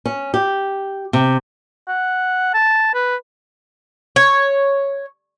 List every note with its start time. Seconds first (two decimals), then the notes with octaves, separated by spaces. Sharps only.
0.06 C#4
0.34 G4
1.13 C3
1.88 F#5
2.54 A5
2.95 B4
4.16 C#5